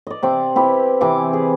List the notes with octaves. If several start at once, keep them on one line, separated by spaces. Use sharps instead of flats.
D5 D#5
C3 C4 D6
C4 E4 G4 B4
C3 E3 G#5 D6
G#4